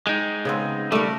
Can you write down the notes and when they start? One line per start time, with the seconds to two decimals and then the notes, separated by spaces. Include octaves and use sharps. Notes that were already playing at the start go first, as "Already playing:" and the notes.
0.07 G#3 D#4 G5
0.45 C#3 B3 C4
0.92 G3 A3 A#4